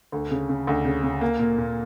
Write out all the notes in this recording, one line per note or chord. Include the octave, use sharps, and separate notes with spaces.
D2
C#3
C#3
D2
C#3
C#3
A#3
A#2
A#2